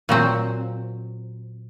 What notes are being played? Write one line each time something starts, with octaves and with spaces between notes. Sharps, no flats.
A#2 F#3 C4